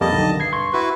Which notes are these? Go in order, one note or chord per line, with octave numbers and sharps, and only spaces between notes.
F2 G3 A#3 D#5 A5
B1 D3 D#3
G2 G#6 C7
C6 C#6 G#6
E4 F#4 B4